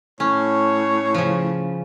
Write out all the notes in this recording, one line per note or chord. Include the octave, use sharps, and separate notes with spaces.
A2 C#4 C#5
C#3 F3